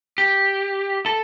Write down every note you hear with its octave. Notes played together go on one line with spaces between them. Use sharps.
G4
A4